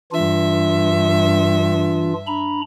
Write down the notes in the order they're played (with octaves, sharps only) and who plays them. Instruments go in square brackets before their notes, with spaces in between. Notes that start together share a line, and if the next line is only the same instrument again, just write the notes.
[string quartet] G2 E5 [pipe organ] E3 D4 F4
[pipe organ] D4 A#5 B5